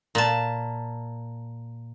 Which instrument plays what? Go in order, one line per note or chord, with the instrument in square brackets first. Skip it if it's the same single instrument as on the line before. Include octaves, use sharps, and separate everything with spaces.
[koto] A#2 A5